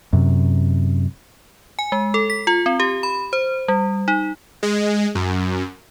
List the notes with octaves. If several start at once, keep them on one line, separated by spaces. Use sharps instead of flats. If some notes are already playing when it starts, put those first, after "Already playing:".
F#2 C3
G#5
G#3
A4
B6
F4
C4
G4
B5
C5
G3
D#4
G#3
F#2